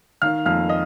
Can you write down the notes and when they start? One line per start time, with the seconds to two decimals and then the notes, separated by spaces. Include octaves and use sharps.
0.22 D#3 F5 F6
0.45 F2 F5 F6
0.69 D#5